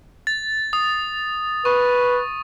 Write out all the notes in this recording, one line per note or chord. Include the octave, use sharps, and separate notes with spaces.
A6
D#6
B4 C#6